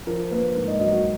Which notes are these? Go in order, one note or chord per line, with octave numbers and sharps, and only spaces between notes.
F3 A#4
A#3 B4
G#2
D#5
F#3 D#5
F#4